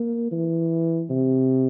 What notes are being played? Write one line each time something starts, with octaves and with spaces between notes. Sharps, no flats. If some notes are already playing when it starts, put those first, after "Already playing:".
Already playing: A#3
E3
C3